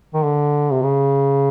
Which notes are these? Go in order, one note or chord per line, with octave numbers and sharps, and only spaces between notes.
D#3
D3
C3
C#3